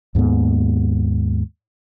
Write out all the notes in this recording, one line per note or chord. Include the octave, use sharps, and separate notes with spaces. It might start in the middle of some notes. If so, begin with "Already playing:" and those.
D#2 G#2 A#3 B3